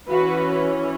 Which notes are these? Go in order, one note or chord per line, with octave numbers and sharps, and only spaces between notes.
E3 C#4 F#4 B4